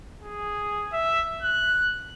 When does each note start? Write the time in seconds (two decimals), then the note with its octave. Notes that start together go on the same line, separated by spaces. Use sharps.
0.22 G#4
0.93 E5
1.42 F#6